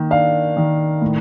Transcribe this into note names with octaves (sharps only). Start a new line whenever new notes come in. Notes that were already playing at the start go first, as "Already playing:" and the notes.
Already playing: D#3 A#3
D4 F5
D#3
A2